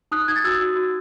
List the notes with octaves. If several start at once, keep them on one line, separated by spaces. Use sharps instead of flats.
D#4 D#6 F#6
D#4 G#6
A6
F#4 E6 G#6
F#4
F#4